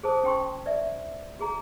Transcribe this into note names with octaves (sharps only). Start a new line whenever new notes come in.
G#4 C5 A5 D#6
C#4 G5 C6 C#6
D5 E5
F#4 G#4 A#5